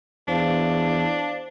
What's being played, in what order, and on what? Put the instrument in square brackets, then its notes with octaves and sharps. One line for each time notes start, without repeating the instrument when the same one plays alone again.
[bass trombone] E2 [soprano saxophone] D4 [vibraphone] C5 F5